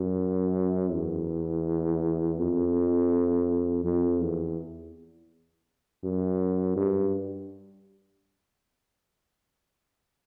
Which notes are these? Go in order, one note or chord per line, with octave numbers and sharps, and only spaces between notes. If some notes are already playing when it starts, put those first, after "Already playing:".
Already playing: F#2
E2
F2
F2
E2
F#2
G2